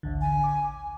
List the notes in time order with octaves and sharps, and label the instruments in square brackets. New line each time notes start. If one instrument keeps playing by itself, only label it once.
[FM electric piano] A1 D2 D3
[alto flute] G#5
[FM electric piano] D6